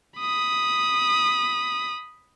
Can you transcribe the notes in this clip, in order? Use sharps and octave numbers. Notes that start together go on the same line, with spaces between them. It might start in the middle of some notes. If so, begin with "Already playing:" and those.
B5 D#6